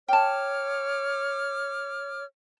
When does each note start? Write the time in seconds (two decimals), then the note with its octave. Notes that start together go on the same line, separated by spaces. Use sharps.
0.08 C#5 G5 A5 D6 F6